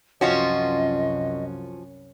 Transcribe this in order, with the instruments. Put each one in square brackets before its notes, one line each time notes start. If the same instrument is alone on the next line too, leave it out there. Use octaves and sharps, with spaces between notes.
[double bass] C2 F#2 [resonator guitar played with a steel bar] F3 F4 F#4 [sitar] C#4 [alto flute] D#5